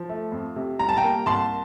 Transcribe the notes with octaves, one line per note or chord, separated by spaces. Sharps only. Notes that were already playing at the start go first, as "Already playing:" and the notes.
Already playing: F3
A3
F2
C3
G3 A#5
A5
G5 A#5
A#3
C2 A5 C6